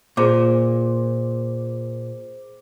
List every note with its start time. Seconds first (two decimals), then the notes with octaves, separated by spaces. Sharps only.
0.17 A#2 G#4 C5 D6